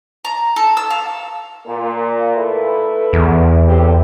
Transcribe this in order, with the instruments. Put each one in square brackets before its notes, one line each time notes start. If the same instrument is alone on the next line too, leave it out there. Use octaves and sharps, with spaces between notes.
[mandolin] A#5
A4
E6
F5
[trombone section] A#2
A3 E4 B4
[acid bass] E2
[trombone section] A2 C4 G4